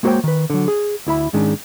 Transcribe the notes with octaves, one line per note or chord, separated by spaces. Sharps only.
G#3 A#3 F#4 C5 C#5 G5
D#3 B4
D3 F#3
G#4
D2 E4 E5 B5
G#2 D#3 G#3 C#4 D4